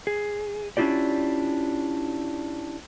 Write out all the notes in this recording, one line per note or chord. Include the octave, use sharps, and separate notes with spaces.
G#4
C#4 D4 E4 F4 G4 D5